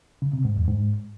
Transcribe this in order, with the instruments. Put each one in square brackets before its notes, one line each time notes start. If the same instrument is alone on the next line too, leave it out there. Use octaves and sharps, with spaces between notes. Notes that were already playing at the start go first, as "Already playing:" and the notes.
[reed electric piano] C#3
C3
G#2
E2
G#2